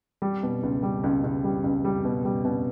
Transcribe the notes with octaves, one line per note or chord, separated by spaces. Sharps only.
G3
B2
C#2
G3
C#2
C#2
G3
C#2
G3
B2
G3
B2